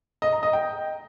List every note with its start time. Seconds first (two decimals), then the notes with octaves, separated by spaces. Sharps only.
0.22 D#5
0.32 A#5
0.43 D#5
0.53 G5